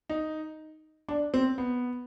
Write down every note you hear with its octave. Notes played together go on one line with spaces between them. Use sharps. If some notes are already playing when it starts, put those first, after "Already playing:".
D#4
D4
C4
B3